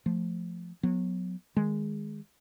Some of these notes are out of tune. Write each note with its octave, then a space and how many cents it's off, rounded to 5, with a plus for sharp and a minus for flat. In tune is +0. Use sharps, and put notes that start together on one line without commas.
F3 +0 A3 +0
F#3 -25 B3 +0
D#3 +0 G#3 +0